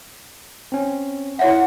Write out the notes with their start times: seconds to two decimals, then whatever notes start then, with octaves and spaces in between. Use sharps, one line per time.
0.72 C4 C#4
1.39 E4 C#5 E5 F#5